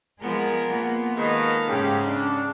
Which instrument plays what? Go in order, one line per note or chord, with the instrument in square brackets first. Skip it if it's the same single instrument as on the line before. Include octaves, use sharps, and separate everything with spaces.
[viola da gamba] F3 B3 [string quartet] G#3 G#4 A#4
[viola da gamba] A#3 B3 F4
[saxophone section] D#3 G#3 [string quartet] A4 F5 [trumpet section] B4 D#5
[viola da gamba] G#2 [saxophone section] C#3 [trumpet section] G4 G#4
[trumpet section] D4